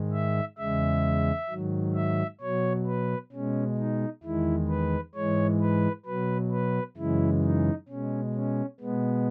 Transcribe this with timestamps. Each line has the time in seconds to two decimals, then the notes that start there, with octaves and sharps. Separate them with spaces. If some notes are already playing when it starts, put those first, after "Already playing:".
Already playing: G#2 D#3 G#3
0.13 E5
0.58 E2 C#3 G#3 E5
1.50 G#2 D#3 F#3
1.95 E5
2.41 B2 F#3 C#5
2.86 B4
3.32 B2 G#3 C#4
3.77 D#4
4.23 E2 D#3 G#3 E4
4.69 B4
5.15 G#2 E3 G#3 C#5
5.61 B4
6.06 B2 F#3 B4
6.52 B4
6.97 F#2 C#3 E3 G#3 E4
7.43 D#4
7.89 B2 G#3 C#4
8.34 C#4
8.80 B2 G#3 B3